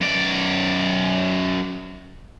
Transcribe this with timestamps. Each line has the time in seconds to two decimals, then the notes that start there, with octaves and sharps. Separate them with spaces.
0.01 F#2 D5